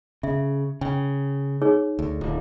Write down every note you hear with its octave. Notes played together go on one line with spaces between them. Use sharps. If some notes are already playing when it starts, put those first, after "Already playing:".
C#3 E5
C#3 G5
D#4 G#4 C#5
D2
D1